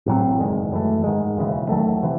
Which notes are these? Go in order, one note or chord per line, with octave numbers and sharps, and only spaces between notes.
A1 A2 F#3 C4
F#1 E2 D#3 G#3
F#2 E3 A3
G#2 D#3 G#3
E1 D#2 C#3 E3
E2 D#3 F#3 A3
C3 E3